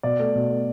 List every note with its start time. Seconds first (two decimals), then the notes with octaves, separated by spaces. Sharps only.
0.03 B2 D5
0.19 A3
0.35 B2
0.50 A3